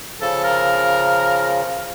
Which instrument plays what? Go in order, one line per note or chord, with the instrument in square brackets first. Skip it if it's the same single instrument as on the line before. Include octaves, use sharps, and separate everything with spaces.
[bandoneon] C#3 F3 [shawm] A4
[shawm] A#4